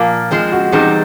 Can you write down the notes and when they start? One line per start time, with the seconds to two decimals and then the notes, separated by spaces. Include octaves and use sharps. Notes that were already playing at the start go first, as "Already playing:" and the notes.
Already playing: A#2 F3 A#3
0.31 F3 G#3 C4
0.52 F#4
0.72 E2 B2 G3 C4 D#4 G#4